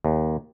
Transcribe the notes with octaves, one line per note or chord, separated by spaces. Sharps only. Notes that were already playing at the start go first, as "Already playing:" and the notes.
D#2